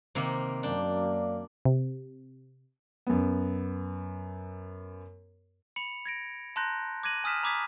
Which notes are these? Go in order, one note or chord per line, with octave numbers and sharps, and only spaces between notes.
C3 D#3 A#3
F#2 A#3 D4 D5 G5
C3
F#2 B3
B5 C#7 F7
G#6 A#6 D7
A5 A#5 C6 F#6 G6 A#6
D6 F#6 G#6 A#6 D#7 F#7
G#5 D#6 F6 B6 E7
A#5 B5 D6 D#6 G#6 B6